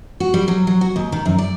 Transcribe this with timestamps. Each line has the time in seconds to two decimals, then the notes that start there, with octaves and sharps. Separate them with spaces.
0.20 F#4
0.34 G3
0.48 F#3
0.67 F#3
0.81 F#4
0.96 D#2
1.12 D#3
1.26 F#2
1.38 D5